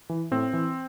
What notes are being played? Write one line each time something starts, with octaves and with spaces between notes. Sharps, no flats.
E3
A2 C4
E3